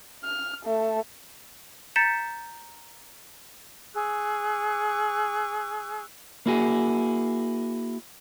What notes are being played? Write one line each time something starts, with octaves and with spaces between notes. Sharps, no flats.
F6
A3
A#5 G6 A6 B6 C#7 E7
G#4 C#6 E6 F#6
A#3 E4 F#4 G#4